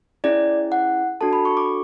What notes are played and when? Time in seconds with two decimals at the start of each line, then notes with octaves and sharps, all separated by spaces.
0.24 C#4 E4 G#4 D5
0.72 F#5
1.21 D4 F#4 A4 A5
1.33 B5
1.45 C#6
1.57 D6